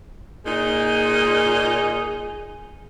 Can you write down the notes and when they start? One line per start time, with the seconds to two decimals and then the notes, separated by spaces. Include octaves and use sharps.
0.47 A#2 D#4 G#4